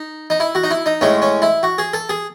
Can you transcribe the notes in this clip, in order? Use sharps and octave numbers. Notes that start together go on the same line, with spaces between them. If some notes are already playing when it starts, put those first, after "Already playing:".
Already playing: D#4
D#4
E4
F#4
D#4
E4
D#4
A2 G#3 C#4
C#4
E4
F#4
G#4
A4
G#4